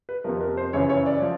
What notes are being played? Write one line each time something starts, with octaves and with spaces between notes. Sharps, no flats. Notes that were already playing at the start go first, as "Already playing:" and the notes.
B4
F2 C3 F3 A#4
A#4
C5
F#2 C#3 E3 C#5
C#5
D5
F3